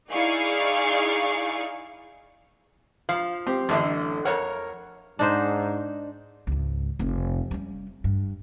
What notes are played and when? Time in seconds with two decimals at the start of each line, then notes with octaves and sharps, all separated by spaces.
0.11 D#4 E4 G#4 D5 F5 C#6
3.09 F3 F5
3.47 C4 G4
3.69 A1 F#2 A2 D3
4.25 F2 A#4 C#5 F#5
5.19 G#2 D4 D#4 C5
6.47 C#2 G#2
6.99 F1
7.51 G3 C#4
8.04 G2